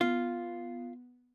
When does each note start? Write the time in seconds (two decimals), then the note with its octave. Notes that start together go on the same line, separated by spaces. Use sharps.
0.01 B3 F4